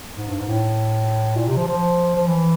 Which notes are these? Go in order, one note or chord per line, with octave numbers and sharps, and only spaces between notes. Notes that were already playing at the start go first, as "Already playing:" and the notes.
G#2
G2
G#2
A2
A#2
C3
F3
F3
F3
E3